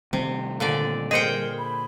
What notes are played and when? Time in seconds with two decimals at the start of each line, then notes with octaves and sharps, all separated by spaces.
0.13 C3 D#3 G3 C4
0.60 A#2 D3 D5
1.11 G#4 A#4 C5 D#5 G5 C#7
1.58 B5